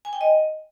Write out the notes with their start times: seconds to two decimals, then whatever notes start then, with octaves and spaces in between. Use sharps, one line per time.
0.05 G#5
0.13 G5
0.21 D#5